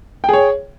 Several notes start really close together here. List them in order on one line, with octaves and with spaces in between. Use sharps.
G5 G#4 C#5